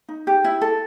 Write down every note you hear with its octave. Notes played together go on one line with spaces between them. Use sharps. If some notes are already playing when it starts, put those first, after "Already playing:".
D#4
G4
E4
A4